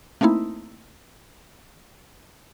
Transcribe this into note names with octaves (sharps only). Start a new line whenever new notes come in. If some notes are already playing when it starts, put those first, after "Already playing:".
A3 A#3 C4 D#4 E4